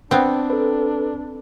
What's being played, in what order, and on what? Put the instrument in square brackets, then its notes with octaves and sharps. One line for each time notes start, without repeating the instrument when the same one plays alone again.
[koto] B3 C4 [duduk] D4
[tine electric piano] A4 B4